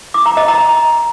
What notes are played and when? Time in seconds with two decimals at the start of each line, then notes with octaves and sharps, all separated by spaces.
0.14 D6
0.26 A#5
0.37 D#5
0.48 A#5